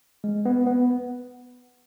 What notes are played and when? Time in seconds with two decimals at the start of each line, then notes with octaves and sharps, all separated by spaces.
0.24 G#3
0.46 B3
0.67 B3